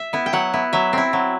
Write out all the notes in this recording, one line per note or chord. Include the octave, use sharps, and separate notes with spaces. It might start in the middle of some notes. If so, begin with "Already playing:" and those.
Already playing: E5
B3 E4
G5
F#3 F#5
B3 E4
F#3 E5
C4 E4
F#3